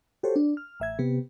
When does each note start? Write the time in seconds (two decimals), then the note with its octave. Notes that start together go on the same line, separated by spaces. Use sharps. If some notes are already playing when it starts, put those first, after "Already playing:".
0.23 F#4 G4 A4 C5 C#5
0.36 D4
0.57 F6
0.80 A1 E5 G#6
0.99 C3 B3 G4